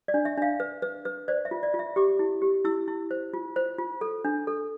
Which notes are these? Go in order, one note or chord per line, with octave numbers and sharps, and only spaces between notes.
D5
D4
E5
D4 F5
B4
B4
B4
C5 D5
E5
F4
D5
F4
E5
G4 D6
E4
G4
E4 E6
E4
C5
F4
C5
F4
A4
D4
A4